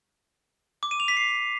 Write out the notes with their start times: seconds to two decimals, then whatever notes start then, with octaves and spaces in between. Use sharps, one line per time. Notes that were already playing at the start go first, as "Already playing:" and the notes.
0.83 D6
0.91 D#7
1.00 F7
1.08 B6
1.17 C7